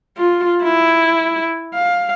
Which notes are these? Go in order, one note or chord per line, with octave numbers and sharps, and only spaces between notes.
F4
E4
F5